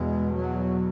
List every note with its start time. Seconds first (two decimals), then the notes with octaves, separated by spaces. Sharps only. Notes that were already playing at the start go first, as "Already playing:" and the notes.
Already playing: E2 B2 G#3
0.34 F#3